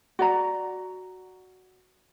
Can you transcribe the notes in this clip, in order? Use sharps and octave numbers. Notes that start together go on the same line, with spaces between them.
F#4 D5 A#5